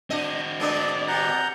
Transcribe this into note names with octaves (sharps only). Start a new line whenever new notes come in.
C4 D4 F#4 D#5
G#3 B3 D4 D5 D#5
B2 G4 F#5 A#5 G6